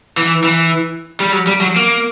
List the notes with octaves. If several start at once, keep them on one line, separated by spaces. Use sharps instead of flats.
E3
E3
G3
F#3
G3
F#3
A#3